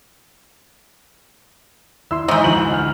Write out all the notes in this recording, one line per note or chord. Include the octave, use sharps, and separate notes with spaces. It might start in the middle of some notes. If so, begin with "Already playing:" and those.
D#2 E4 C6 E6
G#2 E3 C5 D#5 A#5 C#6 D#6 G6
D2 F3 F#7
F6